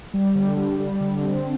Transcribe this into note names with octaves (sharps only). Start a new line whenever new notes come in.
G3
D3
G3
G3
D3
C4